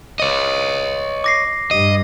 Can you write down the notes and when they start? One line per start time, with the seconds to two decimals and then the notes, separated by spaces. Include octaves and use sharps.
0.20 C#5 D#5
1.24 D6 A#6 C7
1.71 G2 D#5